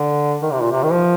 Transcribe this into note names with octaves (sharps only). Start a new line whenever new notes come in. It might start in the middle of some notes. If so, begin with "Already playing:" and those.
Already playing: D3
D#3
C3
A#2
C3
D#3
F3